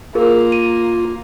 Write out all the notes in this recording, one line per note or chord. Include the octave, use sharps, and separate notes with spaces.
A#3 F4 G#4 A#4
D#7